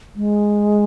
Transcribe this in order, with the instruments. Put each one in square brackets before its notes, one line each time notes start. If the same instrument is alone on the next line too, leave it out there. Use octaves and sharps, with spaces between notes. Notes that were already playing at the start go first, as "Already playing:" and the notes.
[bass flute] G#3